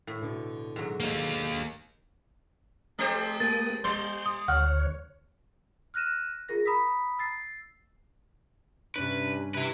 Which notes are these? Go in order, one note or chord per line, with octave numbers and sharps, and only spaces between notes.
A2
B2 D3
G#2 F#3
A#3 D#4
G#3 G4 C5
A#3 D#6 A6
G3 C5 G6
D#6
D2 C#5 F#5 F6
F6 F#6 A#6 D#7 E7
F4 G#4 A#4 A#6
A#5 B5 D#6 E6 B6
E6 A6 C7
G2 C3 C#4 D4 B4
C3 E4 B4